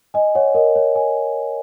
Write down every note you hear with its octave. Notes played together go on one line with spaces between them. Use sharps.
D#5 G#5
C#5 F#5
A#4 D#5
C#5
D#5 G#5